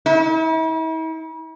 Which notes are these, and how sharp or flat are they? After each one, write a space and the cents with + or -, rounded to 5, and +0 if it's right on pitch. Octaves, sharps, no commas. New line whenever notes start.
E4 -45